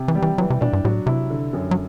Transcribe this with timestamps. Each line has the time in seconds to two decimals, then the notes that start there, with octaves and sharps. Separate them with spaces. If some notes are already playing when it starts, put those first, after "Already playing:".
Already playing: C3
0.08 E3
0.15 G3
0.22 E3
0.38 E3 F#3
0.50 C3
0.61 B2 D4
0.73 G2
0.85 A2 F#3
1.06 C3 E4
1.30 D3
1.53 F#2
1.71 F#3